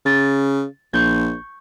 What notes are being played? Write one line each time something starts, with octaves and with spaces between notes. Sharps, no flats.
C#3 A6
A#1 C#6 G6 G#6